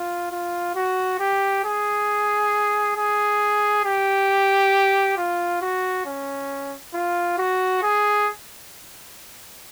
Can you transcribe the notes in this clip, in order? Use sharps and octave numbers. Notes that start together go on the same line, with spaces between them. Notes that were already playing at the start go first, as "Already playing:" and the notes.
Already playing: F4
F4
F#4
G4
G#4
G#4
G4
F4
F#4
C#4
F4
F#4
G#4